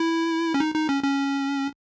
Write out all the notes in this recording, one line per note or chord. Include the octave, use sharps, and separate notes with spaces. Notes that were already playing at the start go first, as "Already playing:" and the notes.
Already playing: E4
C#4
D#4
D#4
C#4
C#4